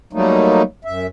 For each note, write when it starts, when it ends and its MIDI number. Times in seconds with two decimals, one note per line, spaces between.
0.13 0.62 54
0.13 0.62 55
0.13 0.62 57
0.13 0.62 58
0.13 0.62 63
0.85 1.07 42
0.85 1.07 76